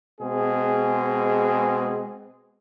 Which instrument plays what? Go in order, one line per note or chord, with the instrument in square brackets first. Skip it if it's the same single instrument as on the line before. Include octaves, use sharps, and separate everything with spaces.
[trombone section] B2 G#3 C4 G#4